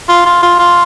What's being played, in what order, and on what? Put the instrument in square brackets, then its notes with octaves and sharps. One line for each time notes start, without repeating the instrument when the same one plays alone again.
[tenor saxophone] F4
F4
F4
F4